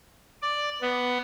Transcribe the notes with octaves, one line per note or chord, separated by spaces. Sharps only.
D5
B3